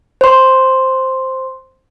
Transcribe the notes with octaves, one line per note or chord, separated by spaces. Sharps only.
C5 C6